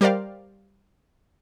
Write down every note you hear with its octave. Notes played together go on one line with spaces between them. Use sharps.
G3 G4 A#4 C5 D5 F5